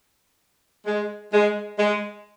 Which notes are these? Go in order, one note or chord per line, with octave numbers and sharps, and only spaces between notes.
G#3
G#3
G#3